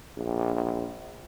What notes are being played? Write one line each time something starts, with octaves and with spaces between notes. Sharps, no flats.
A#1